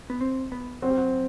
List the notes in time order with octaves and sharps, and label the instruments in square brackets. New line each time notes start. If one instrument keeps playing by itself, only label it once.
[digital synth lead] B3
C4
B3
[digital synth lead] F#3 [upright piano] C4
[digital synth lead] G3
F#3